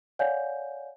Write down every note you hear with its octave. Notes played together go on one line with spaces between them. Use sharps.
C#5 D5 F5 F#5 G#5 G6